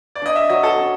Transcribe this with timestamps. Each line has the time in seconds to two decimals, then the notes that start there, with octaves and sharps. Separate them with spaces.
0.15 D5
0.22 D4 D#5
0.36 E5
0.49 F#3 D#5
0.63 A4
0.78 C#4